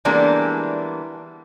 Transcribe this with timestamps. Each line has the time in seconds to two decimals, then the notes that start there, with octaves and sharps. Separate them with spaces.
0.05 E3 G3 G#3 A#3 B3 D4